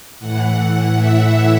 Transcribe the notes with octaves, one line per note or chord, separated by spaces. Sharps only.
A2 E3 F#5
E5